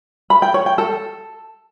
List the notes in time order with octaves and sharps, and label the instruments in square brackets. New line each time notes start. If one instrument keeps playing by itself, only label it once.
[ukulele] B5
G5
C#5
G5
A4